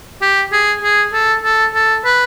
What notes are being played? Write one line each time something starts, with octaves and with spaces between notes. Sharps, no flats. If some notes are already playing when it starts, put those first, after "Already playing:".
G4
G#4
G#4
A4
A4
A4
B4